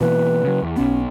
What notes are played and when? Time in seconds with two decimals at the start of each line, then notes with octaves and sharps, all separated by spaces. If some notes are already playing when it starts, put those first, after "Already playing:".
0.01 B2 E3 A#3 B4
0.44 C#3 F#3
0.62 E2
0.76 B1 B3 C#4